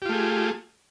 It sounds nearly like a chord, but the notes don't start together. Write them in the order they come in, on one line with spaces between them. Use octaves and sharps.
G4 F4 A3 G#4